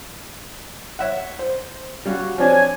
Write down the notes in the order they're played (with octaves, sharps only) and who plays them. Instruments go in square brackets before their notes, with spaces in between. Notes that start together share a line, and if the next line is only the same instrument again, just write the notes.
[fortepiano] C#5 E5 F#5
C5
[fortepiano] G3 C#4 F5 [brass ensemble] F#4
[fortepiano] F3 C4 D4 [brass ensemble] C#5 G#5